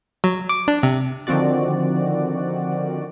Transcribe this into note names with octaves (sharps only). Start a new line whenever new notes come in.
F#3
D6
D4
C3
D3 D#3 F3 C4 F#4 D5